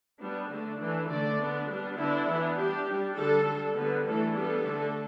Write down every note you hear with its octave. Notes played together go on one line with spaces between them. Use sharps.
G3 B3 D4
D3 A3 D4
E3 A3 D4
D3 A3 D4 D5
D3 B3 D4
G3 B3 D4
D3 B3 D4 E4
E3 B3 D4
G3 D4 G4
G3 D4
D3 G3 D4 A4
G3 D4
D3 G3 B3 D4 B4
E3 A3 D4 A4
G3 B3 D4 A4
D3 A3 D4